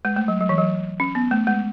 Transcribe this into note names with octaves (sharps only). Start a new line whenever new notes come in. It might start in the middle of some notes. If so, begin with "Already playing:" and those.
G#3
A3
F#3
F#3
E3
F#3
C#4
B3
A3
G#3